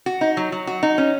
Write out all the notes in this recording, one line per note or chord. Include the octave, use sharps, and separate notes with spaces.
F#4
D#4
F#3
F#3
F#4
D#4
C#4